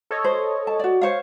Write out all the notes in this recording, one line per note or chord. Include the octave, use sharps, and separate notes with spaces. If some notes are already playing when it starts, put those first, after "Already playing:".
A4 C#5 D#5
C5
A5
F#4 D5
C5 C#5 F5